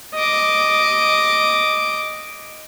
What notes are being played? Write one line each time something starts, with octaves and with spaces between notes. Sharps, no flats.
D#5 D6